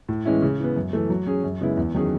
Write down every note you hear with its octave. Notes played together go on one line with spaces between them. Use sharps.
A2
E3 G#3 C#4 E4
C#3
E3 B3
F#2
E3 A3
F#3
C#4 G#4
F#2
C#3 G#3 B3 E4
E2
D#3 F#3 C#4 G#4